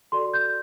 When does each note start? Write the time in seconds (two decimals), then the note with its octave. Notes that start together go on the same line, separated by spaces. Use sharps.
0.12 F#4 A4 D5 C6
0.34 G6